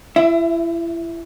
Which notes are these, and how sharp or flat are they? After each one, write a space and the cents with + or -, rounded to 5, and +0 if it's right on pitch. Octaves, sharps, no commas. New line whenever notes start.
E4 +30 E5 +0